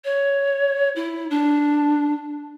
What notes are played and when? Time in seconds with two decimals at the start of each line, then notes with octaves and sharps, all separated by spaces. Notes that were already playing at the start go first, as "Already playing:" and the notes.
0.04 C#5
0.96 E4
1.30 D4